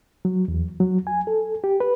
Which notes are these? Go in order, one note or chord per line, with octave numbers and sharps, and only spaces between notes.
F#3
E2
F#3
G#5
A4
G4
B4